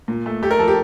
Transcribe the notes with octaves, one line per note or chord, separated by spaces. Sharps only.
A#2
A3
A3 G4
A#4
F3 A4
G4